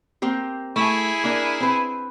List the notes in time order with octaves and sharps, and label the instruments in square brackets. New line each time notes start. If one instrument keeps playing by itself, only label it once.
[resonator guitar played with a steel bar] A#3 C4 G4
[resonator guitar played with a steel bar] A3 [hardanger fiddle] E4 G#4
[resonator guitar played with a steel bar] A#3 D4 A#4
C4 B4